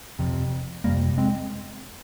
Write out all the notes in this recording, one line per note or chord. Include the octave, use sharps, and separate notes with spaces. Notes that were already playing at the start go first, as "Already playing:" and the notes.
F1 F2 C3
F1 F2 C3 G3 A#3
G#3 C4